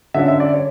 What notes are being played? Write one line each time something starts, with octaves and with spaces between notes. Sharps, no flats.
D3 F#3 C#4 E5
E5
D5
C#5